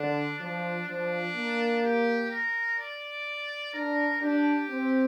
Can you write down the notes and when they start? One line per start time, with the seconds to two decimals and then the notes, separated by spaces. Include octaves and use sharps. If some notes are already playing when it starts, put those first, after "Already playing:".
Already playing: D3 D4
0.40 F3 D4
0.87 F3 D4
1.35 A#3
1.83 G4
2.31 A#4
2.79 D5
3.74 D4 A#4
4.21 D4 G4
4.69 C4